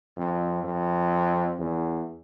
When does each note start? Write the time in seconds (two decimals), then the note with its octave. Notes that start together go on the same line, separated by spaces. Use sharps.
0.17 F2
0.64 F2
1.59 E2